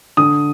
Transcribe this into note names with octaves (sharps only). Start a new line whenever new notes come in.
D3 D#6